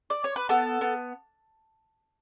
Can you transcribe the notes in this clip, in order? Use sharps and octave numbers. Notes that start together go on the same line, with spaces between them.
D5
C#5
B4
B3 A4
B3